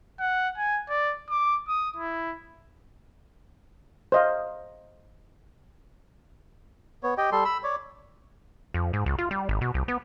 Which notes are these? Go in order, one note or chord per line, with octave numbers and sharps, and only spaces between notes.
F#5
G#5
D5
D6
D#6
E4
C5 D#5 F5
B3 C#5
G4 D#5 G5
G3 A4 C6
B5 E6
C#5 D5
F2
G#2
C#2
F4
G3
G#1
B2
C2
B3